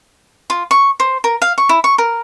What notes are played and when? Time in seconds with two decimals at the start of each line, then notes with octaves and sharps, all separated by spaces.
0.50 F4
0.71 C#6
1.00 C5
1.24 A#4
1.42 F5
1.58 C#6
1.69 E4
1.84 C#6
1.98 A#4